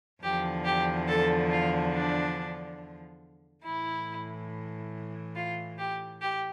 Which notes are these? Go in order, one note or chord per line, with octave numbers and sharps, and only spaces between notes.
E2 D3 F3 G4
G4
A4
F4
D4
A2 E3 E4
F4
G4
G4